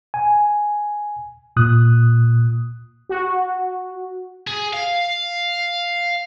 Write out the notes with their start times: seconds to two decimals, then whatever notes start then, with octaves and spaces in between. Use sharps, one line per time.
0.14 G#5
1.56 A#2 D#6 F#6
3.09 F#4
4.47 G#4
4.73 F5